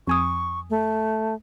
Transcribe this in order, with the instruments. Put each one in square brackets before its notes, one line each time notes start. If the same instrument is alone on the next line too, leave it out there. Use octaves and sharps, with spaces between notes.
[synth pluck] F2 G#5 D#6 [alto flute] C#6
[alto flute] A3